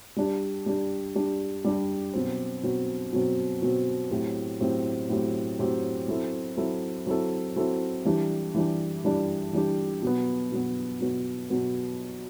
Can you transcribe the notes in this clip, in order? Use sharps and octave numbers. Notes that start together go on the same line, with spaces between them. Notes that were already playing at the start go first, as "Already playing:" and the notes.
G3 D4 G4
G3 D4 G4
G3 D4 G4
G3 D4 G4
B2 F#3 C4
B2 F#3 C4
B2 F#3 C4
B2 F#3 C4
A2 F#3 C4 G4
A2 F#3 C4 G4
A2 F#3 C4 G4
A2 F#3 C4 G4
F#3 C4 E4 A4
F#3 C4 E4 A4
F#3 C4 E4 A4
F#3 C4 E4 A4
E3 G3 D4 G4
E3 G3 D4 G4
E3 G3 D4 G4
E3 G3 D4 G4
B2 F#3 B3
B2 F#3 B3
B2 F#3 B3
B2 F#3 B3